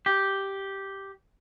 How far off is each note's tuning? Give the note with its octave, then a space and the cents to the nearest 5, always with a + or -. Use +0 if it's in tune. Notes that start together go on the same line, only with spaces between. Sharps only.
G4 -5